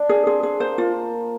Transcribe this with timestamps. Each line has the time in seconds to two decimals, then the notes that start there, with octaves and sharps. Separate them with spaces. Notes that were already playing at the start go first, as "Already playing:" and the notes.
Already playing: D4
0.09 G#4
0.26 C4 G#4
0.43 G#4
0.60 A#3 C5
0.78 A#3 F4